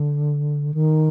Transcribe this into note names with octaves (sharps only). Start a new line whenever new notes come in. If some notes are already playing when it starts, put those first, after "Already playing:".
Already playing: D3
D#3